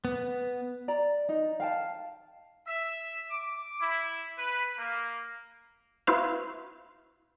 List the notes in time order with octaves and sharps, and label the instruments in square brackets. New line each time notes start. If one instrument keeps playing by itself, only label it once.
[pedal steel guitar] B3
[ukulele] D5 A#5
D#4
F5 G5 A5
[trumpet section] E5
D6
E4
B4
A#3
[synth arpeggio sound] E4 F#4 B4 C5 F5